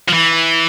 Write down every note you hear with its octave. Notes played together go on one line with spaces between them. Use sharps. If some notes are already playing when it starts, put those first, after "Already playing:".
F3
E3